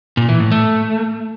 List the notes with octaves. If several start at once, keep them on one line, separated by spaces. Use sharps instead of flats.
A#2
E3
A2
A3